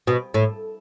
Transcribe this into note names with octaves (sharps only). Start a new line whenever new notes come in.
B2
A2